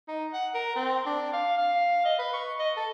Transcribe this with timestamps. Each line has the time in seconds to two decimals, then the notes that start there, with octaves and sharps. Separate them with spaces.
0.08 D#4
0.34 F#5
0.54 A#4
0.76 C4
1.06 D4
1.33 F5
1.58 F5
2.05 D#5
2.19 B4
2.33 C#6
2.59 D#5
2.77 A4